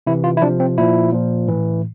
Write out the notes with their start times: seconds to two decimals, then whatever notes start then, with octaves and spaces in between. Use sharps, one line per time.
0.07 C3 E3 E4
0.24 F4
0.37 E4
0.41 C3 F3 D4
0.60 C4
0.78 A#2 F3 E4
1.12 A#2 F3
1.48 A2 E3